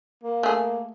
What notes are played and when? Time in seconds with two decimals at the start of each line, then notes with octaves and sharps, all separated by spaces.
0.23 A#3
0.43 A3 G#4